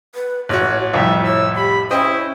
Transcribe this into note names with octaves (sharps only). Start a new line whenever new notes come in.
B4
A1 F#4 C#5
C2 F2 A2 E5 G5
C#5 E6
G4 B5
C#4 E4 C5 D#5 G5